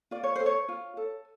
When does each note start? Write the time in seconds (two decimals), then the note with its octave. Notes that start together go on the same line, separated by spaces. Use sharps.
0.11 F4 D5
0.23 C#5
0.36 A4 C5
0.46 C#5
0.69 F4
0.97 A4